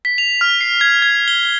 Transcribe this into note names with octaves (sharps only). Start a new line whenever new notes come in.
B6
F7
F6
C7
G#6
G#6
G7